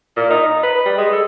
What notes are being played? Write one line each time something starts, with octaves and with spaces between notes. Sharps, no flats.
A#2
D#4
D#4
B4
G3
G#3
A4